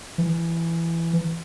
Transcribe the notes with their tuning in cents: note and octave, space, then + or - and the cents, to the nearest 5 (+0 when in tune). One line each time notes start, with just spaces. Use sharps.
E3 +15